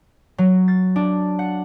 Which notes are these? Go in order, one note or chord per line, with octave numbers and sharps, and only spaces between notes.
F#3
A6
D4
F#5